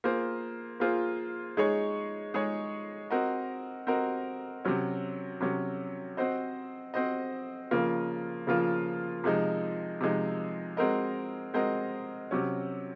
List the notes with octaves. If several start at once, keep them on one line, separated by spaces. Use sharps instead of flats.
A#3 F4 G#4 C5
A#3 F4 G#4 C5
G#3 D#4 G#4 C#5
G#3 D#4 G#4 C#5
C4 F#4 A#4 D#5
C4 F#4 A#4 D#5
C3 F#3 C#4
C3 F#3 C#4
C4 F#4 C5 D#5
C4 F#4 C5 D#5
C#3 F3 A#3 F4
C#3 F3 A#3 F4
C3 F3 G#3 D#4
C3 F3 G#3 D#4
G#3 C4 F#4 A#4 D#5
G#3 C4 F#4 A#4 D#5
C3 F#3 C#4